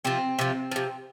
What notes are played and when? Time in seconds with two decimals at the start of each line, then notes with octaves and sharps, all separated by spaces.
0.05 C3 F3 C4
0.39 C3 F3
0.72 C3 F3